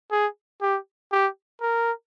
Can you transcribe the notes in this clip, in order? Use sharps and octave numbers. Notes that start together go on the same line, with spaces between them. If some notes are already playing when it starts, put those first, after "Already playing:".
G#4
G4
G4
A#4